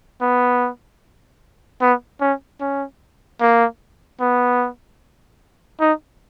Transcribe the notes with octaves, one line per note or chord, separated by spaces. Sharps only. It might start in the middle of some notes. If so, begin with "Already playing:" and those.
B3
B3
C#4
C#4
A#3
B3
D#4